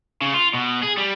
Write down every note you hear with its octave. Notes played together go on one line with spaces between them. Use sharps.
C#3
F4
B2
G#4
G3